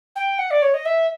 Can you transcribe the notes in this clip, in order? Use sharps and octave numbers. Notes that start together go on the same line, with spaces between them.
G5
F#5
D5
C#5
D#5
E5